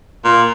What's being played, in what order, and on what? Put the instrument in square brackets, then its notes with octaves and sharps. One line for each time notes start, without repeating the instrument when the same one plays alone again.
[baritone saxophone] A#2